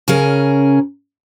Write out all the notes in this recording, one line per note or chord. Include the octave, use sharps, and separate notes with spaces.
C#3 C#4 G#4 A#4